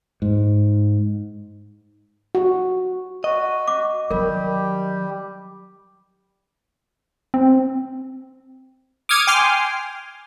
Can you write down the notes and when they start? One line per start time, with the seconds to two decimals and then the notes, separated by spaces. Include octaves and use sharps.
0.22 G#2
2.35 F#4
3.24 F#4 D#5
3.68 D6
4.11 D#3 F#3 G3 G4 A#4
7.34 C4
9.09 D6 D#6 F6 G#6 C#7 D#7
9.27 G5 G#5 C6 D6 F6